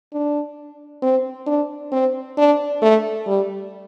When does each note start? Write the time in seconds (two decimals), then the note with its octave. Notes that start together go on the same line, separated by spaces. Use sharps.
0.13 D4
1.02 C4
1.47 D4
1.92 C4
2.38 D4
2.82 A3
3.27 G3